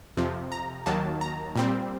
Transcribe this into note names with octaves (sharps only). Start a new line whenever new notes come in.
F2 C3 F3
A#5
D#2 D#3 F#3 A#3 A5
A#5
A#2 G3 C4